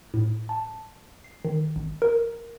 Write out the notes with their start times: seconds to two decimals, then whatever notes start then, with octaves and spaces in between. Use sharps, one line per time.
0.14 A2
0.49 A5
1.24 C7
1.45 D#3
1.76 G#1
2.02 A#4